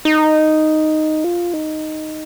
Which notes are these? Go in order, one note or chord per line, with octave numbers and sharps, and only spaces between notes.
D#4
F4
D#4